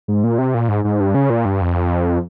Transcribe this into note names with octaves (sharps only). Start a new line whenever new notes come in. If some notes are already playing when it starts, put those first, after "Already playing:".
G#2
A#2
C3
A#2
G#2
G#2
G2
C#3
A#2
G2
F2